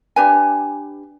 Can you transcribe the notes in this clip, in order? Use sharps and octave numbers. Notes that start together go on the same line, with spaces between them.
D4 G4 B4 G#5